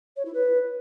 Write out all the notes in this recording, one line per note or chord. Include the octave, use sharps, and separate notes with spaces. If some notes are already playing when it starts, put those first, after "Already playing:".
C#5
E4
B4